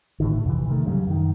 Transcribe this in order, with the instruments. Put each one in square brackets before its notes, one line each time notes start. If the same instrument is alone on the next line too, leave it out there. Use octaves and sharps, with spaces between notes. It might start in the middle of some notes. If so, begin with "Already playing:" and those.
[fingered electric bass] A2 D3 D#3
F2 C3 E3
C3 D#3 A3
G2 C#3 F#3
F#2 D#3